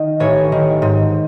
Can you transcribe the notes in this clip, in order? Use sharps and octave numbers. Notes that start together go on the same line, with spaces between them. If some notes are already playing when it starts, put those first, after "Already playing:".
Already playing: D#3 D#5
A1 C#5
D#3
G#2